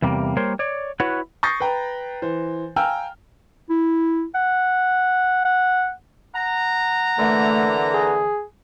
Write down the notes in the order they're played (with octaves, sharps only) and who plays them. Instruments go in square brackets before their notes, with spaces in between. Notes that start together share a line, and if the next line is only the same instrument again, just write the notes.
[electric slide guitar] E2 C3 G3 A#3
G3 A#3 A#4 C5 C#5
C#5 D5
E4 F#4 B4 C#5 F#5
[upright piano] C#6 D#6 G6 A6 A#6 C7
B4 G5 A#5
E3 C5
F5 G5 G#5 A#5 E6 F6
[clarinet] E4
F#5
F#5
[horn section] F#5 A#5
[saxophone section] D3 E3 A#3 [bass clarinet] A3
[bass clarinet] G#4